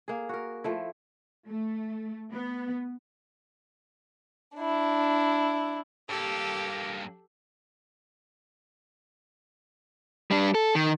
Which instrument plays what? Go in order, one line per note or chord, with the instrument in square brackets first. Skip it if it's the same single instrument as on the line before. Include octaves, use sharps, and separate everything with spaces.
[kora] A#3 G#4
F#4 A#4
F3 A3 E4
[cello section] A3
B3
[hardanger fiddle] D4 E4
[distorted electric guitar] G2 A#3 [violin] G4 A4
[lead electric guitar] G3 D4
A4
D#3